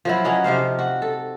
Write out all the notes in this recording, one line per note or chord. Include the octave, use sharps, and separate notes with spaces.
F3 F#3 E4
F#3 C#4 D#4 F#4
C3 F3 C5 F5
F#4
A4